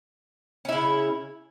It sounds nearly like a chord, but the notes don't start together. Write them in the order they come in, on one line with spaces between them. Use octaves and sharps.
C#4 E4 C#3